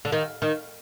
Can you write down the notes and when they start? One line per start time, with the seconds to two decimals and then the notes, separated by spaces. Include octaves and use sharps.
0.05 D3
0.12 D#3
0.42 D#3